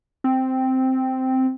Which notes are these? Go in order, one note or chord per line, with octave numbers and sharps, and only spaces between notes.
C4